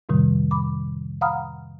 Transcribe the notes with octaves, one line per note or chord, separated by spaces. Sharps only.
F2 A2 C3 D#3 G3
B5 D6
F5 F#5 A#5 B5 D#6 F6